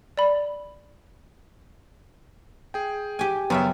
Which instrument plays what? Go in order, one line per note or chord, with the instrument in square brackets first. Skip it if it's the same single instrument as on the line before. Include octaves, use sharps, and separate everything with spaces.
[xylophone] D5 B5
[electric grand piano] G#4 G5
[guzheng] G4 G#5
[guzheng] F#2 C#3 E5 [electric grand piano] B3